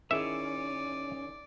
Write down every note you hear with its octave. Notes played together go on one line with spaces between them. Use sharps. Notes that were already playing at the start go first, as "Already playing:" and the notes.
D#3 C#4 E4 G#4 D5 E5